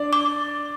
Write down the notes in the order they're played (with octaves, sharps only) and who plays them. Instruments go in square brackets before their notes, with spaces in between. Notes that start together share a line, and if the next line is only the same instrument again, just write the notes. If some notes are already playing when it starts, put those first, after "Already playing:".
Already playing: [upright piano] D4 D5
[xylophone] D6